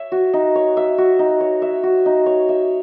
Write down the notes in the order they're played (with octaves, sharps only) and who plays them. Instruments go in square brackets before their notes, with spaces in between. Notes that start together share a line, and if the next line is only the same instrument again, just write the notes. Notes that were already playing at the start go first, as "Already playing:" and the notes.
Already playing: [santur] C#5 E5
F#4
D#4
C#5
E5
F#4
D#4
C#5
E5
F#4
D#4
C#5
E5